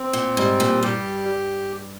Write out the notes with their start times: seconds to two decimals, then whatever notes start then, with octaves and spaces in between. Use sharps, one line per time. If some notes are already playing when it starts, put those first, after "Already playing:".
Already playing: C4
0.13 A#2
0.37 G#2 G3
0.60 A#2
0.83 G2 G4